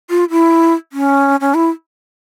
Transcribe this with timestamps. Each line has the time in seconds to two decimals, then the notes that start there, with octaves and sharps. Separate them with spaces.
0.10 F4
0.30 E4
0.93 C#4
1.41 C#4
1.54 E4